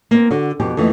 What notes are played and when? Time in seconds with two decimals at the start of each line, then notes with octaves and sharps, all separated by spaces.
0.11 A#3 C4
0.31 D3 F#4
0.60 F2 B2 G4 G5
0.77 F2 D#3 E3 A3 A#3